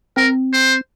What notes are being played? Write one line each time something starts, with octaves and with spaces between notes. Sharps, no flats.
C4 A#4
C5